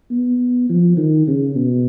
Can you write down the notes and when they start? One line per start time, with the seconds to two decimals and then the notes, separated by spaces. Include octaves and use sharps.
0.10 B3
0.69 F3
0.97 D#3
1.27 C#3
1.55 B2